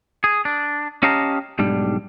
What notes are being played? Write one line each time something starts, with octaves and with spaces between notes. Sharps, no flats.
G#4
D4
C#4 G4 D#5 F5 A5 A#5
B1 G#2 G3 D4